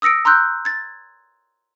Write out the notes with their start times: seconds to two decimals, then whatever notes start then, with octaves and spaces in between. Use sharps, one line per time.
0.02 D#6 E6 A#6 C#7 D7
0.25 A#5 C6 E6 F#6 G6
0.65 G#6 A6